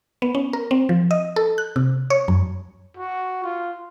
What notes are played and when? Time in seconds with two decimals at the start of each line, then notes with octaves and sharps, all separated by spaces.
0.22 B3
0.35 C#4
0.53 A#4
0.71 C4
0.89 F3
1.11 D#5
1.36 A4
1.58 F#6
1.76 C3
2.10 C#5
2.28 F#2
2.97 F#4
3.44 F4